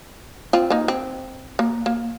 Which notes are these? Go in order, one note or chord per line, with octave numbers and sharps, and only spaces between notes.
C4 F4
A#3 D#4
C4
A#3
A#3